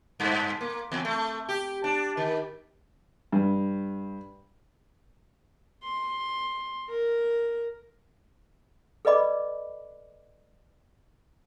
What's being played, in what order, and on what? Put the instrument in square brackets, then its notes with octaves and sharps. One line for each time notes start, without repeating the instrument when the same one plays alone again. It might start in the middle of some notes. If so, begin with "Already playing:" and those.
[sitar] G2
A#3
E2
A3
G4
D4
D#3
[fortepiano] G2
[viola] C6
A#4
[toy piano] A4 B4 D5 D#5 B5 D6